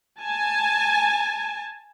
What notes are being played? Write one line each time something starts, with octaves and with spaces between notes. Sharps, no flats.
G#5 A5